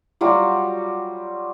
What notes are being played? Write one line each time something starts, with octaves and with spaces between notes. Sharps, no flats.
F#3 G3 F4 F#4